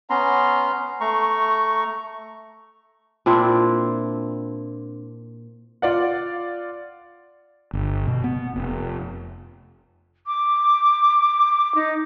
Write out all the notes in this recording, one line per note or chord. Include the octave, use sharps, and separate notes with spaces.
B3 C#4 A#5 C6
A3 A#5 C#6
A#2 C4 D4 E4
F4 D5 F#5
G1
B2
B3
F1
D6
D#4